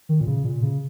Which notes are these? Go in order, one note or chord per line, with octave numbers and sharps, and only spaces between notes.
D#3
A#2
C#3
A#2
C#3